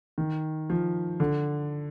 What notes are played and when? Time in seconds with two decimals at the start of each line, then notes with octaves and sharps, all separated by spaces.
0.18 D#3
0.70 F3
1.20 D3